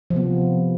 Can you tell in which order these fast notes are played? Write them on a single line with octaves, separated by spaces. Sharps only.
F3 C3 B3